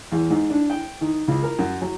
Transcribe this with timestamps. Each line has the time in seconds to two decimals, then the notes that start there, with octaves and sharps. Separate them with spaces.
0.12 E2
0.30 G#2
0.50 D4
0.70 G5
1.01 D#3
1.28 C#2
1.42 A#4
1.59 F#2
1.81 F#3